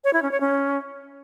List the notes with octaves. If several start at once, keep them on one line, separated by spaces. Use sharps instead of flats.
C#5
E4
C#4
C#5
C#4